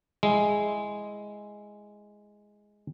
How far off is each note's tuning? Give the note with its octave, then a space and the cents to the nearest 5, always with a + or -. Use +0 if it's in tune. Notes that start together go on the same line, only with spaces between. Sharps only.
G#3 +0 E4 -5